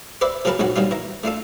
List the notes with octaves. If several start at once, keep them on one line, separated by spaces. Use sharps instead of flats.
B4 C5 D5 E5
F3 F#3 G#4 A#4 B4 A5
A#1 G#2 F#3 F#4
D#3 F#3 G3 F4
E3 A#5
A3 D4 F4 A4